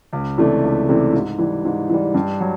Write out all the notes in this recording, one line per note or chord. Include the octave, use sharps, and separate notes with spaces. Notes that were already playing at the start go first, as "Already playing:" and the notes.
C#2
C3 E3 A3 D4
C#2
C3 E3 A3 D4
G#2
E3 G3
G#2
E3 G3
G2
F#3